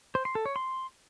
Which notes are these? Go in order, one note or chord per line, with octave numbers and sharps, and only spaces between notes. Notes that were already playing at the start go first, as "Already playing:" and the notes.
C5
C6
A4
C#5
C6